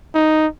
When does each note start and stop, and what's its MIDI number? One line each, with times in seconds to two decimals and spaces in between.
0.15 0.47 63